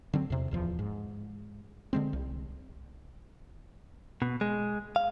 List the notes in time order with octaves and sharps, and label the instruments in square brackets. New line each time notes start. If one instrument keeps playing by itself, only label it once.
[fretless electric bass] D3 F#3 C4
E2 C3
D1 E2 F3
G#2
D3 G#3 C4
C2
[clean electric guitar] B2
G#3
F5